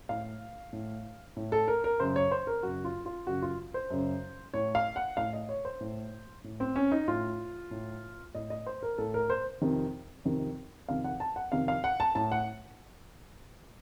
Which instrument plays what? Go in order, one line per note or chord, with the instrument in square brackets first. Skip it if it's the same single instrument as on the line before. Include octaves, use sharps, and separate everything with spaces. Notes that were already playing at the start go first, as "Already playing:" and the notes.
[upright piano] A2 F5
A2
A2
A4
A#4
A#4
F#2 C#3 C5
C#5
C5
A#4
F#2 C#3 F#4
F4
F4
F#2 C#3 F#4
F4
C5
F#2 C#3
A2 C#5
F5
F#5
A2 F5
D#5
C#5
C5
A2
A2
C4
C#4
D#4
A2 F4
A2
A2 D#5
D#5
C5
A#4
A2 A4
A#4
C5
F2 C3 D#3
F2 C3 D#3
F2 C3 D#3 F5
F#5
A5
F#5
F2 C3 D#3 F5
F5
F#5
A5
A2 A5
F#5